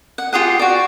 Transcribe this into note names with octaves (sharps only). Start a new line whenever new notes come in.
F#5
F4 G4 G#4 F#5
F#4 D5